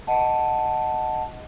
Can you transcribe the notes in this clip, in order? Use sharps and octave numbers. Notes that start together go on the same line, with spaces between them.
D#5 F#5 A5